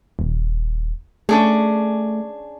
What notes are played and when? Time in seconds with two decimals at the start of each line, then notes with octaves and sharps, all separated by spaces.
0.19 D#1
1.29 A3 C#4 D4 G#4